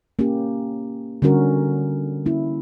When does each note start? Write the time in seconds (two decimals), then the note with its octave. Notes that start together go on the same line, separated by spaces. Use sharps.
0.19 A#3 C#4 G4
1.22 D3 G3 C#4 F#4 A#4
2.26 A#3 C#4 E4